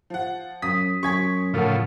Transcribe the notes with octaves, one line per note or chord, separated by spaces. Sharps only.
F3 F#5
F#2 D#6 B6
F#2 F#4 G#5 C#6 G#6 B6
A2 C#3 F3 A4 A#4 F#5